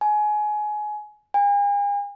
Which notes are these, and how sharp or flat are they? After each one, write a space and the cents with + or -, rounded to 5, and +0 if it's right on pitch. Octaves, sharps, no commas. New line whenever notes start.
G#5 +25
G#5 -40